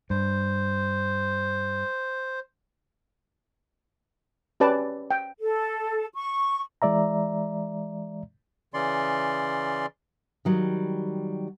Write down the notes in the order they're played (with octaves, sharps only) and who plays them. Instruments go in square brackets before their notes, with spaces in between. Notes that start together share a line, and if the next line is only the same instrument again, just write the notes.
[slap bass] G2 [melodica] C5
[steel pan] C#4 G4 B4 D5 A5
G5
[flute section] A4
C#6
[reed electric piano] E3 G#3 D5 E5 A#5
[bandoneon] C#3 E3 C#4 D5 C6
[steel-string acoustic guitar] D#3 F#3 G3